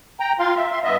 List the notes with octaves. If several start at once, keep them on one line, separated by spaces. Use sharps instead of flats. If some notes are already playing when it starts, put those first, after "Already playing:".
G5 A#5
F4 F5 C6
E5
E5 C6
G2 B3 D#5 E5